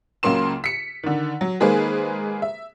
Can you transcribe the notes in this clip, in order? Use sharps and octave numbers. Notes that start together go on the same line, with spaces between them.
C#2 C#3 F#3 A#3 C6 E7
B6 C#7
D3 D#3
F#3
D#3 G#3 A#3 G#4 B4 C5
E5